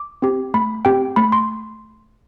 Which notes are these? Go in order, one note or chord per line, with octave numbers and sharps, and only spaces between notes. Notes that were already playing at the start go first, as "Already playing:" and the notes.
Already playing: D6
C4 G4
A3 B5
C4 G4 G5
A3 B5
C6